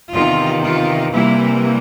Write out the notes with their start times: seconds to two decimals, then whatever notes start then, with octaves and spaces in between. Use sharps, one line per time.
0.12 E2 C3 D#3 F4
0.63 F4
1.12 C3 E3 G3 A#3 E4